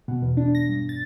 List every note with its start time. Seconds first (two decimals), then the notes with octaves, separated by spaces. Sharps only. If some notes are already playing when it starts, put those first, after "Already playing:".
0.08 B2
0.22 E2
0.37 D4
0.55 A#6
0.68 G2
0.89 A6